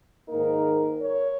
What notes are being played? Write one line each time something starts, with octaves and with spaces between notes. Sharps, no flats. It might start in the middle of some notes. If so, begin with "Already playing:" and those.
G#2 D#3 A#3 D#4 A#4
C#5